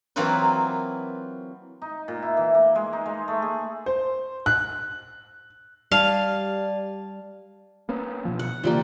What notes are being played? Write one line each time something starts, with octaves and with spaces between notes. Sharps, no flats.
E3 F#3 A#3 C4 F4 B4
D#4
A#2
E4
E3
A#3
G#3
D#4
G#3
A3
G#4
C5
F#6
G3 D5 F5 A5
A#3 B3 C#4
B2 F3
F#5
C#3 E3 F3 G3 A#3